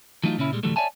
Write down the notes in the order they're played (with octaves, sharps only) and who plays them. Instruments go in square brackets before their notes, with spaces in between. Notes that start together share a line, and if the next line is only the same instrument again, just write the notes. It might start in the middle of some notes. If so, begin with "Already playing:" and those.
[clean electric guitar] E3 F#3 A3 D#4 F4
A#2 C#3 C#4 E4
A#2 G3 G#3
A2 D3 E3 F#3 G3 A3
C#5 D5 E5 G#5 A5